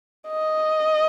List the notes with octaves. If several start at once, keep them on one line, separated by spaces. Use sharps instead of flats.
D#5